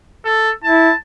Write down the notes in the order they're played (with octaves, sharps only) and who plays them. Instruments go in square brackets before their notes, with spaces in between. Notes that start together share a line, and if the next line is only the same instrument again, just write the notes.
[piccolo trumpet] A4
[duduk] E4 [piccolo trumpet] A5